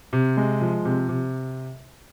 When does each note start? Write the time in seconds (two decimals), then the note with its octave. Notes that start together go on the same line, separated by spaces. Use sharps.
0.13 C3
0.37 G#3
0.61 F3
0.85 C3
1.09 C3